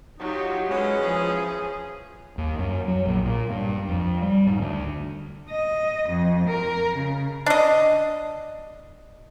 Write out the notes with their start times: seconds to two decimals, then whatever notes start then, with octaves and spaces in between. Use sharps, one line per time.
0.20 F#3 D#4 F4 G4
0.70 E3 G#3 C#4
1.03 F3 G#4
2.38 D#2
2.59 F#2
2.87 F#3
3.05 A#1
3.26 A#2
3.51 G2
3.89 F2
4.22 G3
4.47 G#2
4.60 D2
5.50 D#5
6.09 F2
6.48 A#4
6.97 C#3
7.46 D4 D#5